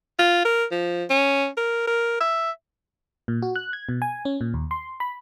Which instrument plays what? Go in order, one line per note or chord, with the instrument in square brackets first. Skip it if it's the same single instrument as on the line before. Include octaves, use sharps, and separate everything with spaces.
[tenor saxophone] F4
A#4
F3
C#4
A#4
A#4
E5
[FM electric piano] A#2
F#4
F#6
G#6
B2
G#5
C#4
A#2
D#2
C6
B5